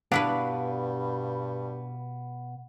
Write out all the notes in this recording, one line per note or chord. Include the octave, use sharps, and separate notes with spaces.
G2 B2 B3 D4 E4 B4 F5